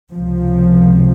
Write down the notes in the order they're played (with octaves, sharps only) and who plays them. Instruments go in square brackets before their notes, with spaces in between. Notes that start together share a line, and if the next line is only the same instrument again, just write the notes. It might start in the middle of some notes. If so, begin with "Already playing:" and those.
[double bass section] C#2 C3 F3